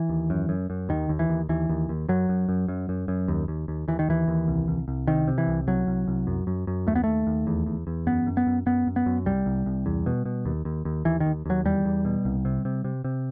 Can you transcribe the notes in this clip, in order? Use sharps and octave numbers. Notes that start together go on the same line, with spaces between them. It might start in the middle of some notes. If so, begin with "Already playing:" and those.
Already playing: E3
D#2
F#2
F#2
F#2
D#2 D#3
D#2
E3
D#2
D#2 E3
D#2
D#2
F#2 F#3
F#2
F#2
F#2
F#2
F#2
D#2
D#2
D#2
D#2 E3
D#3
D#2 E3
D#2
C2
C2
C2
C3 D#3
C3
E3
C2
C2 F#3
C2
C2
F#2
F#2
F#2
D#2 A3
B3
D#2 A3
D#2
E2
E2
E2
F#2 B3
F#2
B3
F#2
F#2 B3
F#2
B3
F#2
C2 G3
C2
C2
E2
B2
B2
D#2
D#2
D#2
D#2 E3
D#3
D#2
D#2 F#3
E2 G3
E2
B2
C2
C3
C3
C3
C3